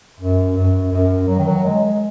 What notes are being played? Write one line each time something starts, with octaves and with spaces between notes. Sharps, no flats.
F#2
F#2
F#2
F#3
D#3
F#3
G#3